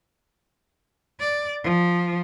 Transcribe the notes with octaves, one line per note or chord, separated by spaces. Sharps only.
D5
F3